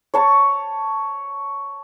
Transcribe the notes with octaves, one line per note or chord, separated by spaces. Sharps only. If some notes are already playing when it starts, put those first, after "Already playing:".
C#5 A5 C#6